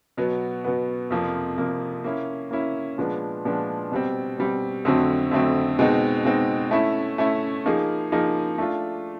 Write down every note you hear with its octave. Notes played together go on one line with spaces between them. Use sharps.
B2 F#3 B3
B2 F#3 B3
F2 C3 F3 A#3
F2 C3 F3 A#3
A#3 C#4 E4
A#3 C#4 E4
A#2 F3 G#3 B3 D4
A#2 F3 G#3 B3 D4
B2 G3 C4
B2 G3 C4
F2 D3 F#3 A3 C4
F2 D3 F#3 A3 C4
B2 G#3 C4 D#4
B2 G#3 C4 D#4
A3 C#4 E4
A3 C#4 E4
F3 A#3 D#4 G#4
F3 A#3 D#4 G#4
A3 D4 F4